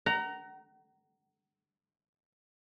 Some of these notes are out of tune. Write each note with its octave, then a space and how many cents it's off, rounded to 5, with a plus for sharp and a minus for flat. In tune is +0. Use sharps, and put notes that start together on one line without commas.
F#5 +40 A#5 +0